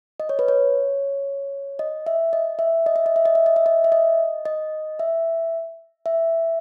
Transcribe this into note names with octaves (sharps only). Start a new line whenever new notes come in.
D#5
C#5
B4
C#5
D#5
E5
D#5
E5
D#5
E5
D#5
E5
D#5
E5
D#5
E5
D#5
E5
D#5
D#5
E5
E5